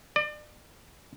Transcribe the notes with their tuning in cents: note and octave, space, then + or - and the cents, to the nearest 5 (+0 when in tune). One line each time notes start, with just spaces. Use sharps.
D5 +35